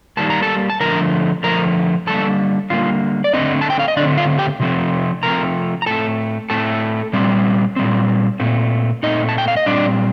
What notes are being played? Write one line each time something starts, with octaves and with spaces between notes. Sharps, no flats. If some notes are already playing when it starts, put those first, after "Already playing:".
D#3 G3 A#3 A5
A#5
A4 A5
A5
D3 F3 A3 A#4 A#5
D3 F3 A3 A#4 A#5
D3 G3 A#3 A4 A5
D3 G3 A#3 F4 F5
D5
D3 A3 C4 D#4 D#5
A5
G5
F5
D#5
D3 A3 C4 D4 D5
F4 F5
G4 G5
C3 F3 A3 C4
C3 F3 A3 C4 A#4 A#5
A#5
A2 A3 C4 A4 A5
A2 A3 C4 A4 A5
A#2 G3 C4
A#2 G3 C4
A#2 A3 C4
A#2 A3 C4 D#4 D#5
A5
G5
F5
D#5
A#2 G3 C4 D4 D5